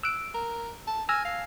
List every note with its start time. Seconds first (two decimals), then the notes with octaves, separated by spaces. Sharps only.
0.03 E6 F#6 D7
0.34 A#4
0.87 A5
1.09 G#5 E6 F6 A#6
1.25 F5